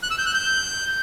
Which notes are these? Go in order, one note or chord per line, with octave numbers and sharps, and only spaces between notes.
F#6
E6
G6
F#6
G6